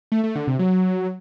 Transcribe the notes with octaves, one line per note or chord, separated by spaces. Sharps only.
A3
A3
D3
C3
F#3